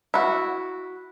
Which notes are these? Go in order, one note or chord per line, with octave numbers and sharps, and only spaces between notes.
E4 F#4